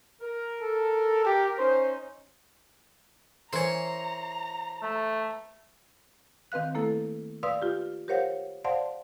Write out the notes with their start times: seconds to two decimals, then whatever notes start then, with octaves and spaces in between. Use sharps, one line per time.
0.21 A#4
0.61 A4
1.26 G4
1.58 C#4 D#4 C5
3.53 E3 A#4 C5 C#5 A#5
4.82 A3
6.52 D#3 C4 B4 F5 F#6
6.75 A3 A#3 E4 A4
7.43 B4 D5 F5 C6 D#6 E6
7.62 F4 G4
8.08 G4 A#4 C5 C#5 F5 F#5
8.65 C5 D5 F5 F#5 A5 C6